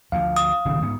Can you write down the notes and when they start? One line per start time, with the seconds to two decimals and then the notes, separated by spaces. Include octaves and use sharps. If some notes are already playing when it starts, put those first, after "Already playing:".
0.12 D2 F3 F5
0.36 D#6
0.65 D#1 G#1 C#3
0.82 G#2 B3